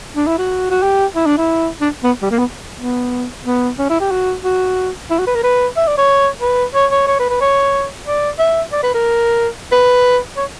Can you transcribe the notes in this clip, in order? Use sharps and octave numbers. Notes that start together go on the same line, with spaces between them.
D4
E4
F#4
F#4
G4
E4
D4
E4
D4
B3
G3
A#3
B3
B3
B3
C#4
E4
G4
F#4
F#4
E4
F#4
B4
A#4
B4
E5
D5
C#5
B4
C#5
C#5
C#5
B4
B4
C#5
D5
E5
D5
B4
A#4
B4
C#5